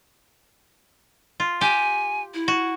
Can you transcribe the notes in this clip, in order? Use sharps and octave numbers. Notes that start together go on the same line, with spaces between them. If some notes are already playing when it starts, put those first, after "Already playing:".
F4
G4 G#5
E4
F#4